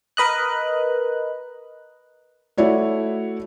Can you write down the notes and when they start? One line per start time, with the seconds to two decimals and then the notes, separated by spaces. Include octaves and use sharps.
0.17 A#4 B4 D#5 F#6
2.58 A3 E4 F#4 C#5 D5